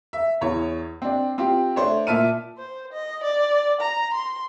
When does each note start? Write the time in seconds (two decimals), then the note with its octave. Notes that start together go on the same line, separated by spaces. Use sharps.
0.13 E5
0.41 E2 C#5
1.02 C4 D4
1.38 C4 F4 G4
1.76 A3 D4 C5 C#5
2.07 A#2 E5 A5 F6 D#7
2.58 C5
2.93 D#5
3.23 D5
3.81 A#5
4.14 C6